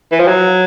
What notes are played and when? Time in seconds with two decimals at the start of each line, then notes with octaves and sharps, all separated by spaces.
0.12 E3
0.20 F3
0.28 F#3